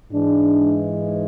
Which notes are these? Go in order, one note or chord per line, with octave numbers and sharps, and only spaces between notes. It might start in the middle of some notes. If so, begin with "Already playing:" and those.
G#2 E3 G#3 D4